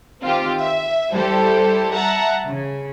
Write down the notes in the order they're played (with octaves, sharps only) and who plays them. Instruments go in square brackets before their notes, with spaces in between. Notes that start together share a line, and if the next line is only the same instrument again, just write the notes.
[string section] D#3 C4 F4 G4
E5
G3 E4 G4 A4 C5
E5 F#5 A5 A#5
C#3